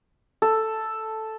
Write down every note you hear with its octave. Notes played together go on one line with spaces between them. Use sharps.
A4